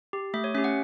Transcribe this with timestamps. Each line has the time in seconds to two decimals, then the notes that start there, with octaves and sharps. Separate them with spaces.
0.13 G4
0.34 A3 E5
0.44 C#5
0.54 C#4 E5
0.58 G4
0.64 F#5